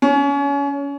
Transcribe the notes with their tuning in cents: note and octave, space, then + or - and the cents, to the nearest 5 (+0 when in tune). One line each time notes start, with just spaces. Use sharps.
C#4 +30